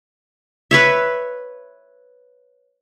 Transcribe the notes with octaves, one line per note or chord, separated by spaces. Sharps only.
B4 C#5 E5